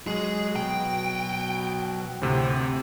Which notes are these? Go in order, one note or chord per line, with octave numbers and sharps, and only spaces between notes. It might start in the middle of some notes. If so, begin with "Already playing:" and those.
F#3 G#3 G#4
B2 G5
D2 A2 C3 C4